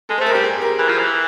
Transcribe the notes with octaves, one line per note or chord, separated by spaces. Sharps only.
G#3 A4
C5
A3
A#4
G3 G4
G#4
A#4
E3 A#4
F3
E3